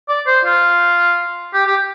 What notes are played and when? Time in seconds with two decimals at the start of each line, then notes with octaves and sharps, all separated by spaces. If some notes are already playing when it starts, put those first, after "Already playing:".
0.09 D5
0.27 C5
0.45 F4
1.54 G4
1.66 G4